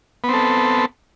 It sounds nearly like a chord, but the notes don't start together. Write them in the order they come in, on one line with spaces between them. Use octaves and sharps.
B3 C4 A4